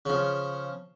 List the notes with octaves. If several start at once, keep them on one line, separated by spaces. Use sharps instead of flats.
C#3 F3